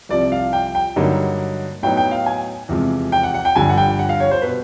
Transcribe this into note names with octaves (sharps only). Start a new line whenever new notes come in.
C2 C3 F3 D5
F5
G5
G5
G2 D3 F#3 A#3 D#4
A2 F#3 B3 D#4 G5
G5
F5
G#5
E2 C3 F3 G#3
G5
F#5
F#5
G5
G1 G2 D3 F3 G#5
F#5
G5
F#5
F5
C#5
C5
B2 B4